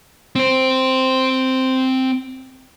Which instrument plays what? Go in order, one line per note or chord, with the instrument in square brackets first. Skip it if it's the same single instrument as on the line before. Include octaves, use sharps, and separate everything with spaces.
[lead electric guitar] C4 C5